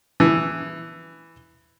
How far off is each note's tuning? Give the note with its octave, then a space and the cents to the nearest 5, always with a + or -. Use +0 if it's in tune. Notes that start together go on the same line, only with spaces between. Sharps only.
E3 +0 B3 +0